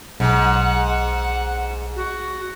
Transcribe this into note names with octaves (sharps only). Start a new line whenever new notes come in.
B1 G#2 F#5
F#4